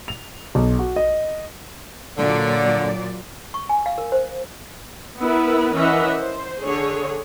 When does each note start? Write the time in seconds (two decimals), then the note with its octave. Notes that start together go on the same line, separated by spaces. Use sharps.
0.08 F7
0.55 B1
0.79 F#4
0.96 D#5
2.17 A#2 D3 F#3 D5
3.54 C#6
3.69 G#5
3.86 F5
3.98 A#4
4.12 C5
5.19 B3 E4 A#4 B4
5.75 E3 C#4 A#4 D#5 E5 F#5
6.17 C5
6.64 D3 G#4 C#5